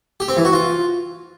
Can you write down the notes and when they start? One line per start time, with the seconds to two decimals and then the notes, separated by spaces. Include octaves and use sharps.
0.20 G4
0.28 C4
0.37 E3
0.45 F#4
0.53 F4